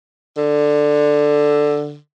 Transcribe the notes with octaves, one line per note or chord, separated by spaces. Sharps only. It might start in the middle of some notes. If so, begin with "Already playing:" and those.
D3